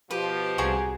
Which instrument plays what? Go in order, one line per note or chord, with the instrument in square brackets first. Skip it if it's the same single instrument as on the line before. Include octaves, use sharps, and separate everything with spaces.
[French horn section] B2 F3 [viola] G4 [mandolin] B4
[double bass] C2 [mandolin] F#4 G#4 A#5